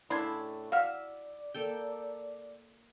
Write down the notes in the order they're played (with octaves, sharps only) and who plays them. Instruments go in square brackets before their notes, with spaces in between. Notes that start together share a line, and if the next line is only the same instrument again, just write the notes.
[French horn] A2 [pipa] C#3 D4 C6 [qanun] E4 [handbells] B5 G#6
[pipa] F#4 [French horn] D5 [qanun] E5 [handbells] F5 F6
[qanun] A#3 A4 G5